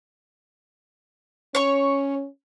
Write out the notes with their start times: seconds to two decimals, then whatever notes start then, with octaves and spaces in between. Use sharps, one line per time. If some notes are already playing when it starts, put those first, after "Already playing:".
1.55 C#4 C#5 C#6